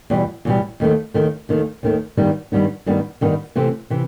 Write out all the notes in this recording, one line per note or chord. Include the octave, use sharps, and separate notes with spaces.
E2 B2 G3
E2 B2 G3
D#2 D#3 A3
D#2 D#3 A3
D#2 D#3 A3
D#2 D#3 A3
G2 D#3 G3 B3 D#4
G2 D#3 G3 B3 D#4
G2 D#3 G3 B3 D#4
G2 D#3 G3 B3 D#4
C3 E3 A3 C4
C3 E3